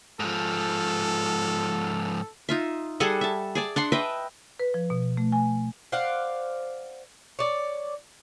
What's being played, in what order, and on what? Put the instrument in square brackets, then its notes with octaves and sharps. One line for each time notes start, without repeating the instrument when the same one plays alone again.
[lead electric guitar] G#2 F3 [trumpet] A4
[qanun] D#4 F4 E5
G3 G#4 A4 F#5
E5 A5
G#4 D5 A5
D4 F#5 C6
B4 D#5 E5 G5
[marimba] B4
F3
B2
A3
G#5
[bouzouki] C5 D5 F5 F#5
C#5 D5